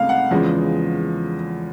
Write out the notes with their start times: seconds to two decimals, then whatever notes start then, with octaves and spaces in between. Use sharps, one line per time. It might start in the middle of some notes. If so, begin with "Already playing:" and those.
Already playing: C#2 C3 A3 F5
0.09 F#5
0.31 E2 C#3 F3 G#3